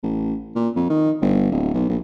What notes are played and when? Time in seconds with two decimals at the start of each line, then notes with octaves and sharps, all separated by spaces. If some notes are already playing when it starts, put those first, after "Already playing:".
0.03 A1
0.56 A#2
0.76 F2
0.90 D#3
1.22 G1
1.51 D1
1.74 B1
1.89 A#1